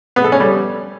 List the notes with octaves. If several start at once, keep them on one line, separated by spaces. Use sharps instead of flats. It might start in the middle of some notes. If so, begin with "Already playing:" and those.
B3
A4
C#4
G3